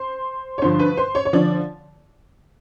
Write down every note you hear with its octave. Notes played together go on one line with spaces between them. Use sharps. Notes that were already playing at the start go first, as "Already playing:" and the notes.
Already playing: C5
C#5
G2 D3 F3 C5
B4
C5
C#5
C#5
D3 F3 D5